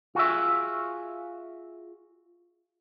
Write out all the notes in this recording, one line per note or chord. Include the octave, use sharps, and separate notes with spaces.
F4 F#4 G#4 E5